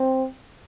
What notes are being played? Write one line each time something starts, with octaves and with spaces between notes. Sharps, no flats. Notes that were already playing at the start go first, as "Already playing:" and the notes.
Already playing: C4